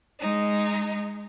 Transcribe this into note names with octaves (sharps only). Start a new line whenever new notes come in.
G#3 D#4